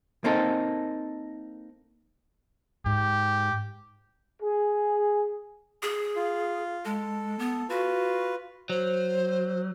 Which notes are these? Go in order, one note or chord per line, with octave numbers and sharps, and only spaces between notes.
A#3 C4 D#4 A4
G#2 G4
G#4
G#4
F4
G#3 A4
B3
F4 F#4 B4
F#3 C5